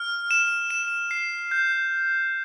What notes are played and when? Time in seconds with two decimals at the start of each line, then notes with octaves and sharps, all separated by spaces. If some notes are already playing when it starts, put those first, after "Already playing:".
Already playing: F6
0.31 E7
0.70 E7
1.11 C7
1.51 G6